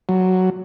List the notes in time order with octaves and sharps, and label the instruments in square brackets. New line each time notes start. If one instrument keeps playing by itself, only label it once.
[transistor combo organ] F#3